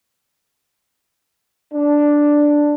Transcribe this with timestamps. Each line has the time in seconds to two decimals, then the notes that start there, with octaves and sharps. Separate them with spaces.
1.73 D4